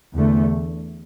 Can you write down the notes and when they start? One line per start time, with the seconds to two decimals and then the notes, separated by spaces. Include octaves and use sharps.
0.16 E2 D3 A3